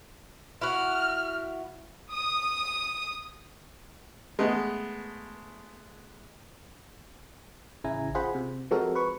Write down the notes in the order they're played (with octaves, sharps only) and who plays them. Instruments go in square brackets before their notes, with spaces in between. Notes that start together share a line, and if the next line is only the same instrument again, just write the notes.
[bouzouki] E4 F#4 [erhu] F6
[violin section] D#6
[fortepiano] G#3 A3 B3
[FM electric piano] A1 C#3 E4 G#5 A#5
F4 G#4 C5 F#5 B5
C3
F3 G#3 C4 F#4 A4 A#4
B4 C#6